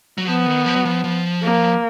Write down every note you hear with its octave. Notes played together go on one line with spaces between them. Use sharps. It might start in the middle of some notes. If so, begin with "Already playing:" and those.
F#3
F3 B3
D#3
F3
F#3
F3
F3
A#3